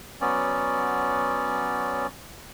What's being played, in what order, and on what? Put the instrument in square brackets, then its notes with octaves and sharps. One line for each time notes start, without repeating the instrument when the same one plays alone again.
[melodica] F#3 B3 C#4 D5